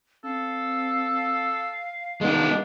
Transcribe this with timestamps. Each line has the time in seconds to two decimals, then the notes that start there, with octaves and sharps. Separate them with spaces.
0.24 C4 A4 F5
2.21 D#3 G#3 B3 D4